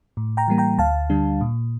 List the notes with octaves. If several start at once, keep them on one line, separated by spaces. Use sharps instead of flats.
A2
G5 A#5
E3 G3 A#3
G5 A#5
D2 F5 A5
D3 G3 D4
A#2